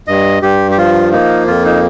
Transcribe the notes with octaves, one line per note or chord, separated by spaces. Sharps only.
G2 D#5
G2 G4
G4
F3 F4
A#3 D#4
F2 F4
D#4